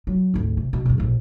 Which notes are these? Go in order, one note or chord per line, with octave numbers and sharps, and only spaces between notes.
F#3
G#1 D2
C3
B2
C#2 F#2
A#1 F2